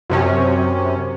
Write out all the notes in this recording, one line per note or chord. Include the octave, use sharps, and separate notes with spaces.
F#2 C3 C#4